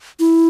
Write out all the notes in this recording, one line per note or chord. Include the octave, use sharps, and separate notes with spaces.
E4